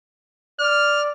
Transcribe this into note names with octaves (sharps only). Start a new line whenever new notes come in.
D5 F6